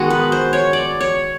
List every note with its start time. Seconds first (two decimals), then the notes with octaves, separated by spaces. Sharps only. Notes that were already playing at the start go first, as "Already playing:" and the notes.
Already playing: D#3 G#3 B3 F#4
0.10 B4
0.32 C5
0.53 C#5
0.73 D5
1.01 C#5